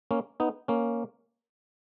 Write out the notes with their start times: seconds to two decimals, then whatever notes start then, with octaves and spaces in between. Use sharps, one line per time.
0.11 A#3 C#4
0.40 B3 D#4
0.68 A#3 C#4